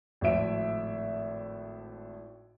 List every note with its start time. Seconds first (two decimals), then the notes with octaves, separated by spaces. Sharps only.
0.21 G#1 A2 F3 E5 D7